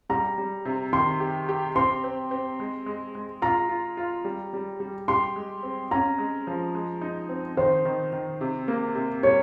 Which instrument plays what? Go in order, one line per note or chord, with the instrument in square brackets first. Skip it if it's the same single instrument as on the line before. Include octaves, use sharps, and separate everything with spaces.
[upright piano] G3 [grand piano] A#5
[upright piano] G3
C3
[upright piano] D#3 [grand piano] C6
[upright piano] G4
G4
[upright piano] C4 [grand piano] C6
[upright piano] C4
C4
G#3
G#3
G#3
[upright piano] F4 [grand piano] A#5
[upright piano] F4
F4
G3
G3
G3
[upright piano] G4 [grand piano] C6
[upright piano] G#3
C4
[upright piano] C#4 [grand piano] A#5
[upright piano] G#3
F3
G#3
D#4
C4
[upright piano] D#3 [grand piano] C5
[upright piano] D#3
D#3
C3
A#3
C3
[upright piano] G3 [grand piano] C#5